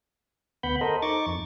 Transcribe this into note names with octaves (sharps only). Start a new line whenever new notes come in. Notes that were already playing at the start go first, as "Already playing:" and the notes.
D2 B3 F#5 B5 G6
A4 A#4 C5 D#5
D#4 C#6 D6 A6
F2